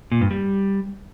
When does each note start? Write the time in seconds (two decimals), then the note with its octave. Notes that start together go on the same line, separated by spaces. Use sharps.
0.12 A#2
0.21 G2
0.31 G3